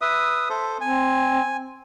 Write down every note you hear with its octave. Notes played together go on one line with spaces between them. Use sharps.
B4 E5 D#6
A4 C5
C4 G#5